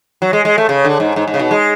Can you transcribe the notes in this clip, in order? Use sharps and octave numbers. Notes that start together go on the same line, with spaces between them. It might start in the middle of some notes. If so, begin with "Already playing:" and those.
F#3
G#3
G#3
A3
C#3
D3
G#2
G#2
G#2
C#3
B2
G#3